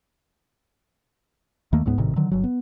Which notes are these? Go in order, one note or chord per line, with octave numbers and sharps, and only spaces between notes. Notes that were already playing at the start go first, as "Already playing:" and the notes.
D#2 D#3 A3 A#3
C#2 G#2 B3
G#1 A2 C3 D#3
D3 D#3 F#3
G1 F#3
B3